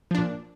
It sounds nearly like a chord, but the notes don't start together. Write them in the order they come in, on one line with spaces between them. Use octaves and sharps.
F3 D4 A#2